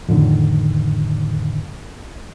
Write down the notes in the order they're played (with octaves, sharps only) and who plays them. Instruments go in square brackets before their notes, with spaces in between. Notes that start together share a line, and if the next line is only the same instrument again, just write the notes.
[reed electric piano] F2 A2 D3 D#3